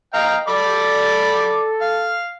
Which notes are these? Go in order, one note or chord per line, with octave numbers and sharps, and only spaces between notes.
D#5 F5 G5 A#5
A4 D5 B5 D6
F5